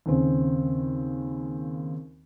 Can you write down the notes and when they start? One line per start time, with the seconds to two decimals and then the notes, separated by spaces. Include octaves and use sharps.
0.06 D#2 C#3 C4